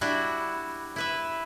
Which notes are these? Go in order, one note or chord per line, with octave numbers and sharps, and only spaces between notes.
G3 D4 E4 F#4
E4 B4 E5